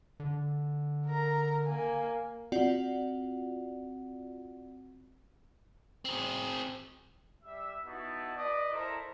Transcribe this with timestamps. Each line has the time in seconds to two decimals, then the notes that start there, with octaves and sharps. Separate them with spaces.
0.20 D3
1.06 A#4 A#5
1.66 A#3 G#5
2.52 C4 F4 F#4 D5 F#5
6.05 C4 G#4
7.44 G3 E5
7.86 B3 D#4 E4 F#4 A5
8.36 B4 D5 D#5
8.72 E4 A4 A#4 C5 A#5